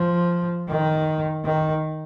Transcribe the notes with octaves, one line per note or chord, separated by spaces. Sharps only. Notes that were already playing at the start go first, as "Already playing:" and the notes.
Already playing: F3
D#3
D#3